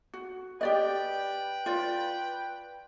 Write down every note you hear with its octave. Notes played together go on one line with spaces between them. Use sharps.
F#4
G4 B4 D5 D#5 G5
F4 D5